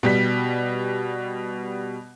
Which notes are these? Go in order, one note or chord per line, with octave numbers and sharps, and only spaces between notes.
B2 G3 B6